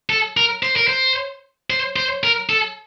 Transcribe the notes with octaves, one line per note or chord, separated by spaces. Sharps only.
A4
A#4
C5
A#4
C5
C5
C5
A#4
A4